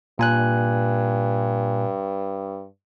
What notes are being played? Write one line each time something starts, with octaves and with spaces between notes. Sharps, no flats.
G2 A#2 G#5 F#6